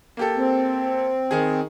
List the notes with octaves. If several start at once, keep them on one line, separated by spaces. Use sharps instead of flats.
A#3 G4 A4
C4
D#3 G#4